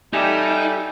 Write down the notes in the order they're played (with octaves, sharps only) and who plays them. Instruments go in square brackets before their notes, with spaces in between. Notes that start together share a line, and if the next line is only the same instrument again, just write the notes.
[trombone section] G3 [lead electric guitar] D#4 [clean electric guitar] G4 A4 E5 [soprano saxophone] G#5